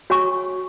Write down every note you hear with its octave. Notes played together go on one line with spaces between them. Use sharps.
F#4 C#5 G#5 C#6